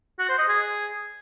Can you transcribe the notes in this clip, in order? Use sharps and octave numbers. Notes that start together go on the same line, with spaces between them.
F#4
C5
D#5
G#4